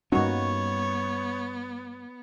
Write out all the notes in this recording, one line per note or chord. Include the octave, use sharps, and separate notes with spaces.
G2 G3 A#3 B3 C#4 D#4 F#4 C#5